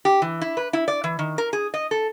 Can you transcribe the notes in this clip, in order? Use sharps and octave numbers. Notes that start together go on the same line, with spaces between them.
G4
E3
E4
B4
E4
D5
E3
D#3
A#4
G#4
D#5
A4